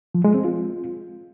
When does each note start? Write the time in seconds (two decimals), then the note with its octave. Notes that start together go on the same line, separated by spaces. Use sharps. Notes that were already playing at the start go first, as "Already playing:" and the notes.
0.15 F3
0.24 G#3
0.34 C4
0.44 F4